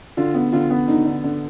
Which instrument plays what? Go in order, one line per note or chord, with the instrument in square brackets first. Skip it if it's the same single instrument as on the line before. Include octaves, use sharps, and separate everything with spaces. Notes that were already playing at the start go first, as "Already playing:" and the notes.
[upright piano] D3 [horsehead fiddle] F4
[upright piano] B3
[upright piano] D3 [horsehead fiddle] F4
[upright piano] B3
[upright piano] D3 [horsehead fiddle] D#4
[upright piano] D3
D3